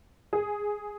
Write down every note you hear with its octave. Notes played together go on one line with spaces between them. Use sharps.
G#4